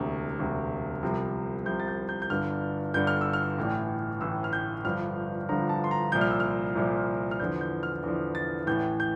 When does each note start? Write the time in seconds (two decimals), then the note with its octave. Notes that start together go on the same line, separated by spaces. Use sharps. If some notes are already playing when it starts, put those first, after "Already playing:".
Already playing: E1 D2 C3
0.39 E1 D2 C3
1.03 C2 C3 F3
1.66 C2 C3 F3 G6
1.80 A6
1.88 G6
2.09 G6
2.22 G6
2.30 G1 G2 D3 F6
2.94 G1 G2 D3 G6
3.07 F6
3.21 E6
3.33 F6
3.58 A1 A2 E3
4.21 A1 A2 E3 E6
4.44 F6
4.53 G6
4.85 G1 G2 D3 F3 F6
5.49 G1 G2 D3 F3 A#5
5.69 A5
5.84 C6
5.91 A#5
6.12 C2 A#2 F3 G6
6.21 F6
6.31 E6
6.40 F6
6.75 C2 A#2 F3
7.31 F6
7.39 E2 D3 F3 G6
7.61 G6
7.83 F6
8.03 E2 D3 F3
8.35 A6
8.67 A1 A2 E3 G6
9.00 G6